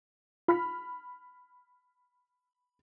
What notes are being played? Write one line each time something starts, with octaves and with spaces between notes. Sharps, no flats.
F4 B5 F6 B6